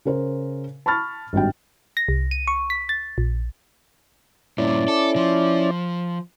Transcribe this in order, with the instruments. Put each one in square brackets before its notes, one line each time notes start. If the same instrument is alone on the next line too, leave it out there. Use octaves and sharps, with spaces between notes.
[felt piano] C#3 A#4 C5
A5 B5 C#6 F6 A6
G#1 G2 F#4 G5
[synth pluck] A#6
C2
D#7
C#6
B6
A6
A#1
[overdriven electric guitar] G2 A#2 [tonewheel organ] C#4 E4 D5
[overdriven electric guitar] A4
F3